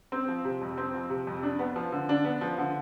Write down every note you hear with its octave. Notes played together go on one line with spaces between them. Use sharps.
C4
F3
C3
F2
C4
F3
C3
F2
D4
B3
F3
D3
D4
B3
F3
D3